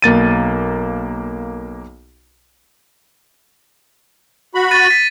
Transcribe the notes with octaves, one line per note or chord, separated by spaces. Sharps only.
B1 A#3 A6 D#7
F#4 B5
A6 D#7
B6